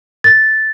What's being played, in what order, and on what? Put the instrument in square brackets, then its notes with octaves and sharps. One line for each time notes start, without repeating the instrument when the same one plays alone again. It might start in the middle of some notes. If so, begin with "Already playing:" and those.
[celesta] A6